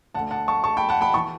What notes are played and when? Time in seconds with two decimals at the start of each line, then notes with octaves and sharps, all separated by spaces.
0.14 D2 D3 F#5 A5
0.31 F#5 A5
0.48 A5 C#6
0.64 A5 C#6
0.77 G5 B5
0.89 F#5 A5
1.01 G5 B5
1.14 E3 A5 C#6